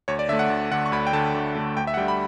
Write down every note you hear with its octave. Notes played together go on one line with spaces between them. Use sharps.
D2 C#5
D5
D3 A3 E5
F#5
D2
D3 A3 F#5
C#6
D2 B5
G5
D3 A3 A5
D2
D3 A3
D2 G5
E5
F#5
D3 G3 G5
B5